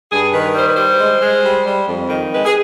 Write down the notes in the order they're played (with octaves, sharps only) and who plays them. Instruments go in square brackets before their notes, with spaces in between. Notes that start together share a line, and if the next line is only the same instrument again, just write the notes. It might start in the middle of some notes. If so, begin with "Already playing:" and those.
[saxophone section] G2 G#4
D#3 B4
G3 C5
B4
G3 C5
G#3
G#3
G3
G3
F2
D#3
G#3 B4
G#4